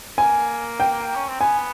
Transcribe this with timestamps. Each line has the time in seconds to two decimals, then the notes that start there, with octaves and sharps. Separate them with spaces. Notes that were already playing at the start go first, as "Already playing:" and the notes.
0.18 A#3 G#5
0.80 G5
1.15 C#4
1.28 C4
1.40 B3 G#5